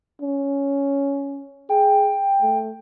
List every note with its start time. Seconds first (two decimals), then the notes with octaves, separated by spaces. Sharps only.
0.22 C#4
1.70 G#4 G5
2.42 A3